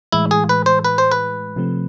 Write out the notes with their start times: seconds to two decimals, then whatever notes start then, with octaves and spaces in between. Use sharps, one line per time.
0.12 A2 E3 G#3 E4
0.31 G#4
0.49 B4
0.66 C5
0.85 B4
0.98 C5
1.12 B4
1.56 C3 F3 A3 C4